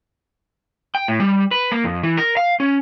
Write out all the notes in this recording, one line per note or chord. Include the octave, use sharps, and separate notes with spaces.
G5
A2
G3
B4
A#3
F2
E3
A#4
F5
C#4